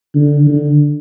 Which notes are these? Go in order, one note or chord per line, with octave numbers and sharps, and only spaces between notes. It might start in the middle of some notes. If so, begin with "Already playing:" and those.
D3
D3